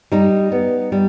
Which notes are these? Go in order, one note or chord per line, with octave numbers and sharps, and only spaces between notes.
G3 D#4
B3
G3